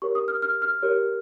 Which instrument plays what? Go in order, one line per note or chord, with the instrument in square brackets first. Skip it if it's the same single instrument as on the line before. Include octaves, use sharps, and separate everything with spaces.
[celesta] G4 A#4 C#5 C#6
D#6
F6
F6
F6
G4 A#4 C#5